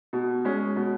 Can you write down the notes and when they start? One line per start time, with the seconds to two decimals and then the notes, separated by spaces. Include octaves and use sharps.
0.13 B2
0.45 G#3 C#4
0.76 B2